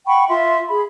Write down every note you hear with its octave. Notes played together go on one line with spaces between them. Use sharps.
F#5 G5 B5 C#6
F4 E5 C6
G#4 B5